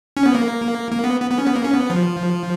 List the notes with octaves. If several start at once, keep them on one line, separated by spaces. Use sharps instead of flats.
C#4
B3
A#3
A#3
B3
B3
B3
C#4
B3
A#3
C#4
B3
F3